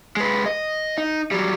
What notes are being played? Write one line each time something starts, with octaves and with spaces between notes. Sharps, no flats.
G#3 B4
D#5
D#4
F#3 G3